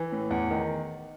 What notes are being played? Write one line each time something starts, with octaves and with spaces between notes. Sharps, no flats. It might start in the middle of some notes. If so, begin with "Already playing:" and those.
Already playing: E3
A2
E2
D#3